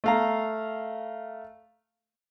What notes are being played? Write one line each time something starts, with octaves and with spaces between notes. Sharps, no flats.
A3 F5 A#5